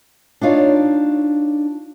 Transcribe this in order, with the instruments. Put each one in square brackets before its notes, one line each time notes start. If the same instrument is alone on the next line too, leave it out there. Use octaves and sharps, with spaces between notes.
[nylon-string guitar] D4 D#4 F4 C#5